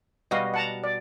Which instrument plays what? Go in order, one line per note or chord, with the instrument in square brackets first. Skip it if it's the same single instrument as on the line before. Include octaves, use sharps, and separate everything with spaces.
[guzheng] B2 G3 F#4 [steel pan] D#5 F5
[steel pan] F#5 A5 A#5
D5